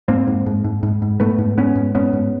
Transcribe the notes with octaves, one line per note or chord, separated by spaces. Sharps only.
G#2 A#3 C4
G#2
G#2
G#2
G#2
G#2
G#2 A3 B3
G#2
G#2 B3 C#4
G#2
G#2 B3 C#4
G#2